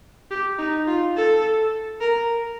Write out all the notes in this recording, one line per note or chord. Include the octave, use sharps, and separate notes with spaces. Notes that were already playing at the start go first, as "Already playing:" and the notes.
G4
D#4
F4
A4
A#4